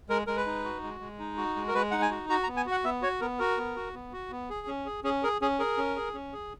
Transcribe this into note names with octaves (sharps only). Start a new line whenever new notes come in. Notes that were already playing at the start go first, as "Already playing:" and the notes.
G#3 A#4
G#3 A#4
B4
D#4
F#4
G#3
G#3
D#4
F#4
G#3
A#4
G#3 B4
D#4 F#5
G#5
F#4
F#4 A#5
A#5
B3
G#5
F#4 F#5
B3 E5
F#4 C#5
B3 A#4
F#4 A#4
B3
F#4
B3
F#4
B3
G#4
C#4
G#4
C#4 G#4
G#4 A#4
C#4 G#4
G#4 A#4
C#4
G#4
C#4
G#4